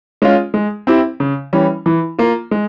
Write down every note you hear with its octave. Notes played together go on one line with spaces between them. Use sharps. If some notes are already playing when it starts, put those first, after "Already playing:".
G#3 C#4 F4
G#3
C4 E4 G4
C#3
E3 G3 C#4
E3
A#3 F4
G#3